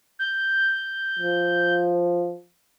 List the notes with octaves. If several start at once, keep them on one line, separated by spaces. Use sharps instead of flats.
G6
F3